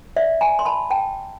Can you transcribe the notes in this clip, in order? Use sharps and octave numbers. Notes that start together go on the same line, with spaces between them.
D5 E5
G#5 A#5
C6
A5 B5
G5 A5